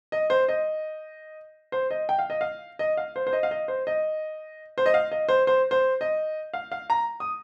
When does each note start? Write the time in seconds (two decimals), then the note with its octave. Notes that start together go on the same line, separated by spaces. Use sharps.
0.12 D#5
0.30 C5
0.48 D#5
1.72 C5
1.91 D#5
2.09 G5
2.19 F5
2.30 D#5
2.41 F5
2.79 D#5
2.97 F5
3.16 C5
3.27 C5
3.33 D#5
3.43 F5
3.51 D#5
3.68 C5
3.87 D#5
4.78 C5
4.86 D#5
4.94 F5
5.12 D#5
5.29 C5
5.47 C5
5.71 C5
6.01 D#5
6.54 F5
6.72 F5
6.90 A#5
7.20 D#6